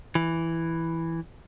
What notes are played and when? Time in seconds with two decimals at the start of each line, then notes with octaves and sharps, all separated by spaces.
0.15 E3